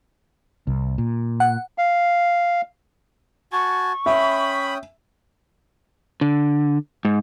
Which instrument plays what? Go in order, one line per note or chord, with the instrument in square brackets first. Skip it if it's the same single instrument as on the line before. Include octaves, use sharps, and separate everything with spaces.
[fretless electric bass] C2
A#2
[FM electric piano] F#5
[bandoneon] F5
[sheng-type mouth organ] F#4 G#5 A5 [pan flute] C#6
[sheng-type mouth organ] C#4 G5 D#6 [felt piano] E5 [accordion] B5
[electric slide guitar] D3
G#2